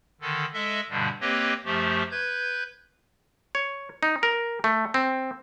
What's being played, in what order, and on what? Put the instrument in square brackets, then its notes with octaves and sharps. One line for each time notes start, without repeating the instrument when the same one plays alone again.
[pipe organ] D3 D#3 A4
G#3 A4 D#5 E5
G2 B2 D3 G3
A#3 C4 G4 B4 C#5 D#5
F#2 F3 A3 G4
B4 G6 G#6
[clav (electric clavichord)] C#5
D#4
A#4
A3
C4